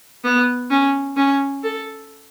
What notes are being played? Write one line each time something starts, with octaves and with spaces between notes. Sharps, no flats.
B3
C#4
C#4
A4